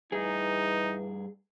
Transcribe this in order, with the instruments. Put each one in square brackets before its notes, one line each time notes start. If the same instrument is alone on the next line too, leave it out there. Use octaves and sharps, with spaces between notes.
[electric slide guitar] G2 G#4 [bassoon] E3 [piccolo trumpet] D#4